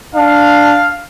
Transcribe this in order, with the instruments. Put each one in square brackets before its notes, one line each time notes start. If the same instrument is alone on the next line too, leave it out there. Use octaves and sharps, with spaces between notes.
[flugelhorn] D4 [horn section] F5